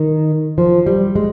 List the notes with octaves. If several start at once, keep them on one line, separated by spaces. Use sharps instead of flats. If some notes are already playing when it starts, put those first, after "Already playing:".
Already playing: D#3
F3
G3
G#3